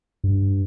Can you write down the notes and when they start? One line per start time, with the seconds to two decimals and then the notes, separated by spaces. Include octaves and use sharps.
0.24 G2